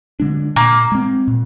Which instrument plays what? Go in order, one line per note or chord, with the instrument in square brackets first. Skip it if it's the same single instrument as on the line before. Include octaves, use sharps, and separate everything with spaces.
[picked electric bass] D3 G#3 D4
[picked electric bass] A#2 [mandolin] A#3
[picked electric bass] G#3 C4
A#2